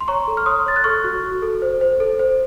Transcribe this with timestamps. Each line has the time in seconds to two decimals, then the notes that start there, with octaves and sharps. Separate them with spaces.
0.01 C6
0.08 C#5 A#5 C#6
0.28 A4
0.37 F6
0.46 C#5 C6 D#6
0.66 C#5 A6
0.76 F#6
0.84 A4 C#6 F6
1.04 F#4
1.23 F#4
1.42 A4
1.62 C5
1.81 C5
2.00 A4
2.19 C5